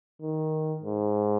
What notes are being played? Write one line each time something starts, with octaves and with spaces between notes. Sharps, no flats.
D#3
G#2